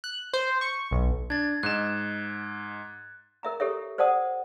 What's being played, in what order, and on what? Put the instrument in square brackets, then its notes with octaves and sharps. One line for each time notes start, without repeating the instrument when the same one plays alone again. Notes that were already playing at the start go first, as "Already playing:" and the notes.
[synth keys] F#6
C5
C#6
B1
[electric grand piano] D4 [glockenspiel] G#6 A6
[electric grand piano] G#2 D#5 E7 [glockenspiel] F#6
[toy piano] A#4 E5 A#5
G4 A4 C#5 E5
C5 D5 F#5 A5 D#6